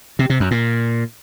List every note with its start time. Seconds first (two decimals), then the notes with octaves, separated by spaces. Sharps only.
0.19 C3
0.30 C3
0.40 F#2
0.51 A#2